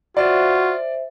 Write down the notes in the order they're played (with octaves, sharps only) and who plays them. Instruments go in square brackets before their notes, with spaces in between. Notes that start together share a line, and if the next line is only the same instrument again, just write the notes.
[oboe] F4 [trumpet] F#4 [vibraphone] C5 E5 [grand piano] D5